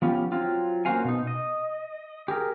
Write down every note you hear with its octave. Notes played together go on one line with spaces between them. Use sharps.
F3 B3 C#4 F4 G4
F#3 C4 F4
A#3 C#4 F#4 C5 F5 G#5
B2 D#4
D#5
G4 G#4 A#4